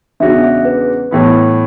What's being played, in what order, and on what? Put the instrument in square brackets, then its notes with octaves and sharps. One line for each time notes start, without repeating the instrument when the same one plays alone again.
[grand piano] E2 C#3 G#3 D4 F#4 [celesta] E5
[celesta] E5
B4
[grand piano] A2 E3 B3